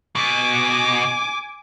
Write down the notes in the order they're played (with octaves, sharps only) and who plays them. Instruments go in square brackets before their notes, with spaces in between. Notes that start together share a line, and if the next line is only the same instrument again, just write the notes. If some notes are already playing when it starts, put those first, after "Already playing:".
[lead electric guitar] B2 [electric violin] G#5 D6